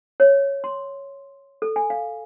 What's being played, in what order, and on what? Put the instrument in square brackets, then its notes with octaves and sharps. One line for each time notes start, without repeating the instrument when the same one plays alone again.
[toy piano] C#5
C6
A4
G#5
F5